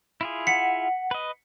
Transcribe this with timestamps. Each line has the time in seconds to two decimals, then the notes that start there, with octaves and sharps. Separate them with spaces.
0.21 E4 F4 G#4
0.47 F#5 B6 C#7
1.11 B4 D#5